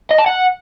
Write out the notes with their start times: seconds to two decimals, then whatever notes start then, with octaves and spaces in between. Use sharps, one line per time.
0.11 D#5
0.18 A5
0.26 F#5